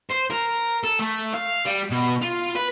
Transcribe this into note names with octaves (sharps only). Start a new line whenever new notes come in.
C5
A#4
A4
A3
F5
G3
B2
F4
B4